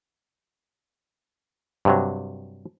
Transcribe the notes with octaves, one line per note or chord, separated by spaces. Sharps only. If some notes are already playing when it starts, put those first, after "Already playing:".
G2 C3 F#3